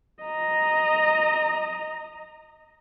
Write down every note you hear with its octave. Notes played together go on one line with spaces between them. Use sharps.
D#5 A#5